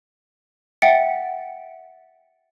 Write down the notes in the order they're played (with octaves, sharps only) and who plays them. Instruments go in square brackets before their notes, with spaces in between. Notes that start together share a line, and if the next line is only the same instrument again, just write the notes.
[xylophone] E5 F#5 G5 A6 C#7